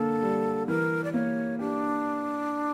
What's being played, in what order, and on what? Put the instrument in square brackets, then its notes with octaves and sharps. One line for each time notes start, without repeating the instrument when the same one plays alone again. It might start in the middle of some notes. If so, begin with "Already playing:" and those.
Already playing: [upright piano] D3 A#3 [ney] A4
[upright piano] G3
[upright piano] E3 [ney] A#4
[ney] D5
[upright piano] A#3 [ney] C#5
[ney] D4 [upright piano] G4